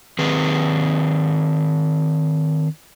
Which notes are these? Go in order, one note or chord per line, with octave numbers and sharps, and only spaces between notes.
D#3 C4 G#4 B4